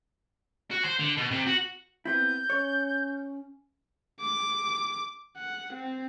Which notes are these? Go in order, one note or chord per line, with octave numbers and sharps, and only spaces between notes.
F#4
C5
D3
B2
C3
F#4
B3 C4 E4 G6
C#4 C#5
D6
F#5
C4